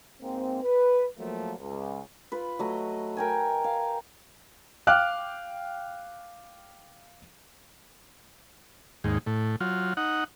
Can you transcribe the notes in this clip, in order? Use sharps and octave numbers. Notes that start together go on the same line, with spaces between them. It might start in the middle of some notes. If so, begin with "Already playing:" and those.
G#2 A#3 C4
B4
F3 F#3 A3 A#3
C#2
F4 B4
F#3 A3 D#5
A#4 G5 G#5
F5
F5 G5 D6 F6 F#6
D#2 G#2
A2
F#3 F4
D#4 F#5